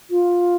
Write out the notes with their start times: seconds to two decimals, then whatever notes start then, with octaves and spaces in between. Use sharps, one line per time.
0.10 F4